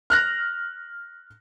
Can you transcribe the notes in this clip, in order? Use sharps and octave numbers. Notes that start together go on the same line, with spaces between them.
F6 F#6 A#6